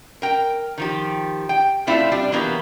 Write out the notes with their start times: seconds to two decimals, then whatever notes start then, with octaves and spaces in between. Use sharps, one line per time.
0.22 A#4 G5
0.78 D#3 F3 G4
1.49 G5
1.87 A3 C4 D4 E4 F4
2.12 G3 D4
2.32 E3 F#3 A#3 B3 G4